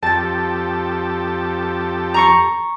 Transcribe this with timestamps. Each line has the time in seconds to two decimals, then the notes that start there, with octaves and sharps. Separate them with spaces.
0.03 F2 G4 A4 A5 A6
2.14 A#5 C#6 C#7